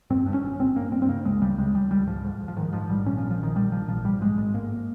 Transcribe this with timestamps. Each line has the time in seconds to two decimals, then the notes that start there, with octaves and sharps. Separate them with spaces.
0.10 G2 C4
0.26 G2
0.34 C#4
0.43 G#1
0.60 G#1 C4
0.75 G2 A#3
0.92 G2 C4
1.02 C4
1.09 C#3 A#3
1.25 C#2 G#3
1.42 C#3 G3
1.58 C#2 G#3
1.74 C#2 G3
1.91 C#2 G3
2.07 G#2 F3
2.24 G#2
2.40 G#2
2.48 F3
2.57 G#2 D#3
2.73 G#2 F3
2.90 A#1 G3
3.06 A#2 C#4
3.18 F3
3.22 A#1
3.31 F3
3.39 A#1 D#3
3.56 A#2 G3
3.72 A#1 F3
3.88 A#1 F3
4.05 G#2 G3
4.21 G#2 G#3
4.38 G#1 G#3
4.54 G#2 A#3